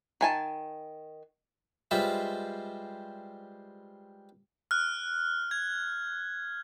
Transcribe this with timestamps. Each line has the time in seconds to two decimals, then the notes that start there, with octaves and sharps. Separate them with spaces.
0.21 D#3 G#5 A5
1.91 G3 G#3 F4 B4 C5 E5
4.71 F6 F#6
5.51 G#6